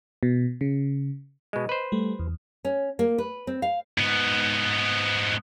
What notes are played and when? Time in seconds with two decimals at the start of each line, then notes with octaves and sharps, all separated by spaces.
0.23 B2
0.61 C#3
1.53 B2 G#3 D#5
1.69 B4 C5
1.92 G3 A3
2.19 E2
2.65 C#4
2.99 A#3
3.18 B4
3.47 C4
3.62 F5
3.98 G#2 B3